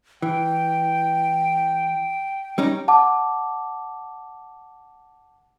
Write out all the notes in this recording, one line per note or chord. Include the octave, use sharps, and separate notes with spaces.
E3 G5
G3 C#4 D#4
F#5 A5 D6